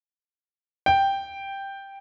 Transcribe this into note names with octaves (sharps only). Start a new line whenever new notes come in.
G5